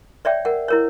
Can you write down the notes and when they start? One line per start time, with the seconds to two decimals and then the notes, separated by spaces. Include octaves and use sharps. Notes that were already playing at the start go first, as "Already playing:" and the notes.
0.25 C#5 D5 E5 G5
0.45 A#4 F#5
0.68 E4 A#4 C#5